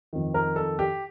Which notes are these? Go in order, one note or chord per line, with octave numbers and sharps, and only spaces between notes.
F2 D#3
A#4
A4
G4